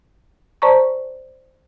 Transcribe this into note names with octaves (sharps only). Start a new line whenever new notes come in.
C5 D5 A5 A#5 C#6